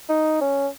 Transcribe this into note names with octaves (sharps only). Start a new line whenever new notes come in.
D#4
C#4